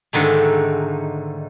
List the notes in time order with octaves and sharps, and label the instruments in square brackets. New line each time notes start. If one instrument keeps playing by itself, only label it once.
[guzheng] G#2 D3 D#3 A3